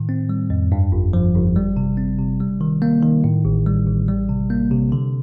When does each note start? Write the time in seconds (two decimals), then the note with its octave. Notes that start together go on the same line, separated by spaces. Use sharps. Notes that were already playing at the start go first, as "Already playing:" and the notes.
Already playing: A2 D#3
0.09 C4
0.29 G3
0.50 F2
0.72 G2
0.92 G1
1.13 F3
1.35 G1
1.56 G3
1.77 C3
1.97 C4
2.19 C3
2.40 G3
2.61 D#3
2.82 A#3
3.03 D#3
3.24 A2
3.45 A1
3.66 G3
3.87 A1
4.08 G3
4.29 C3
4.50 A#3
4.71 C3
4.92 D3